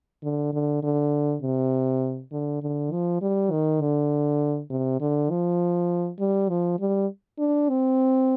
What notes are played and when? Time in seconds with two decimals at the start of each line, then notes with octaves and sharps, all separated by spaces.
0.23 D3
0.53 D3
0.83 D3
1.42 C3
2.32 D3
2.62 D3
2.92 F3
3.21 G3
3.51 D#3
3.81 D3
4.70 C3
5.00 D3
5.30 F3
6.19 G3
6.49 F3
6.80 G3
7.39 D4
7.69 C4